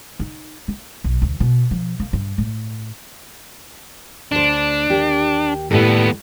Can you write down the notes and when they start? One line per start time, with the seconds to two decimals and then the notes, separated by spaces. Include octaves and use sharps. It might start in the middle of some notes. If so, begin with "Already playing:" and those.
0.19 D#4
0.68 A#3
1.04 B1
1.22 D2
1.40 B2
1.71 F3
2.00 A#3
2.13 G2
2.38 A2
4.32 D2 D4 C5
4.90 D#2 G4
5.71 D#2 A2 G3 B3 A4